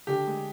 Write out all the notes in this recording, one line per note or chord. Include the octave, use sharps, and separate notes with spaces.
D3 G4
G#3